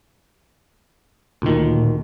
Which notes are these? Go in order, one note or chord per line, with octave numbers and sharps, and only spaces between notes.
D2 A#2 D#3